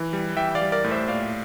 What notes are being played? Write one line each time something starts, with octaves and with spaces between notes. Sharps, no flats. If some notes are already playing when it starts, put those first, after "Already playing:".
Already playing: E3
G3
E3 E5 G5
D5 F5
G3
A#4 D5
A2
C5 E5
A#2 D5 F5